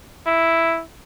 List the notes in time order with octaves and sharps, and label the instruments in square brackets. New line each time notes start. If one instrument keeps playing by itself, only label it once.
[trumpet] E4